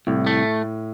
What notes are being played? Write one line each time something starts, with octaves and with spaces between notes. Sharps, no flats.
C2 A2
A3